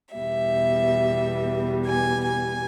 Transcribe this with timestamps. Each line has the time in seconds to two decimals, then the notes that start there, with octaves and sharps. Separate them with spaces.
0.15 E2 B2 G3 E5
1.85 G#5
2.28 G#5